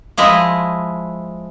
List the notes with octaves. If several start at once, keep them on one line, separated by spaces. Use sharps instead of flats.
F3 G#3 E4 D#5